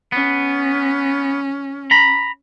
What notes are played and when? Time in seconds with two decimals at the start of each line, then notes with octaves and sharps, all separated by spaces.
0.12 B3 C#4
1.91 A#5 B5